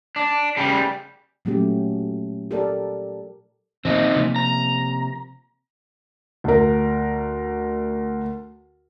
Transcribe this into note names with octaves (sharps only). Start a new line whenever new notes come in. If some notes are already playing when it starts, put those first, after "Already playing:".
D4
C#3 G3
A#2 F#3 A3 C#4 G4
G4 A4 A#4 D5
A#2 D#3 F3 C4 D#4
C3 F3 A#3
A#5
D2 A#4